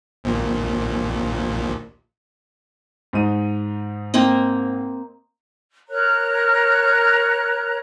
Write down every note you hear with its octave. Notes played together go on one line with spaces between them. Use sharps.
A#1 D#2 A#2
G#2 D#4 D#7
A#3 C4 D#5
A#4 C#5 A#5 F#6